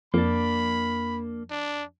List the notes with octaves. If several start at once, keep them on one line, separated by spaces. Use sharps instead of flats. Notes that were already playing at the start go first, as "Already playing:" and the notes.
F2 A#3 D4 B5
D4